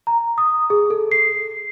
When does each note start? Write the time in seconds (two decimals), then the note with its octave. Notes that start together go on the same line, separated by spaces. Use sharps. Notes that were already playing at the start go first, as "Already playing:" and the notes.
0.07 A#5
0.38 D#6
0.70 G#4
0.90 A4
1.12 C7